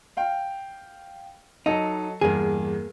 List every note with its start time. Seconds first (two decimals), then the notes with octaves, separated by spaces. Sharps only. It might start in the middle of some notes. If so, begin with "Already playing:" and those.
0.17 F5 G5
1.66 F#3 D#4 A4 D#5
2.21 E2 G2 A#3 G#4